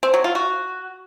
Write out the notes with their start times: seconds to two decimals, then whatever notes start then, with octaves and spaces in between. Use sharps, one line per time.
0.03 C4
0.14 F#3
0.24 F4
0.35 F#4